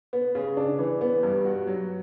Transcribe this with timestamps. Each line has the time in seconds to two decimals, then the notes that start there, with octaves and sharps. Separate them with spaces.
0.13 B3
0.35 C#3
0.57 D4
0.79 E3
1.01 B3
1.23 G2
1.45 F#4
1.67 F#3